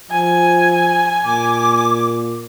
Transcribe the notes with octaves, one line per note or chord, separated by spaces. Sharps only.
F3 G#5
A#2 D6